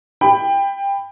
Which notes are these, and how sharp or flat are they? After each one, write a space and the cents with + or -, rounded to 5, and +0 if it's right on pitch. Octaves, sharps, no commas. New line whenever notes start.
G5 +20 B5 +10